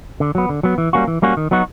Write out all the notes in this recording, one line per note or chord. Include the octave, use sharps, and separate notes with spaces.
D3
F#3 B3
D3
F#3 B3
E3
G3 A#3 C#4 F#4
E3
G3 A#3 C#4 F#4
D#3
F#3 B3 D#4 F#4